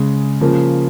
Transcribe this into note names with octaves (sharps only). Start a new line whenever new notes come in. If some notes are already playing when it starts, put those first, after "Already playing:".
Already playing: C#3 G#3
C#3 F3 A#3